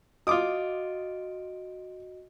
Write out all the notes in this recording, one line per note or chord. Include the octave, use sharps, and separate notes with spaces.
F4 F#4 D#5 D6 D#6 D7